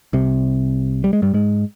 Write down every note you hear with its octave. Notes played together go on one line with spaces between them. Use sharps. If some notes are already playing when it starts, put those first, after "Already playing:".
C2 C3
G3
G#3
G2 G3
G#2 G#3